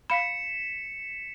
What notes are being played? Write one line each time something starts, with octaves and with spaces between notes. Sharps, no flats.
F5 B5 B6 C#7 E7